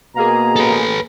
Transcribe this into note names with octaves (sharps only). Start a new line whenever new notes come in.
B2 A#3 G#4 A#5
A4 B4